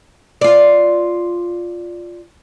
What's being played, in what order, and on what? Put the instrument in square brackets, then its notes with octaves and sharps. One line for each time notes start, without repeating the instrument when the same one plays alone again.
[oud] F4 D5